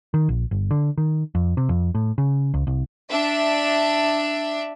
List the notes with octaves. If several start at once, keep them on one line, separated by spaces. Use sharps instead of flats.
D#3
A#1
G1
D3
D#3
F2
C3
F2
A2
C#3
C#2
C2
D4 E5